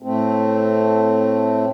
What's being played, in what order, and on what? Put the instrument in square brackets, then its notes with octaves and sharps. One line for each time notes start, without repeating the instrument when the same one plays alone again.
[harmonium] A2 A3 C4